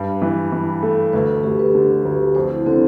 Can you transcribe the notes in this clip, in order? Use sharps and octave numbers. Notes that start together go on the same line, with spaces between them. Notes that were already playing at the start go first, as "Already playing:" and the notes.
Already playing: G2 B4
E3
E3
A3
D2 B4
A4
D2 G4
B4
D3
D2
F2 C5
E4
D3 C4